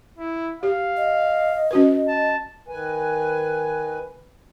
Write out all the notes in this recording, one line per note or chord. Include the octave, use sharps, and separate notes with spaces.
E4
G4 F5
D#5
C#4 F#4 B4
A5
D#3 B4 G#5